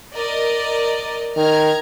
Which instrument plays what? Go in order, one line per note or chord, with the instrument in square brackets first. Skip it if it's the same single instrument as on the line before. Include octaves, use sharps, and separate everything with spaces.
[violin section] A#4 D5 D#5
[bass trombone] D#3 [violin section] A#5 F6 G#6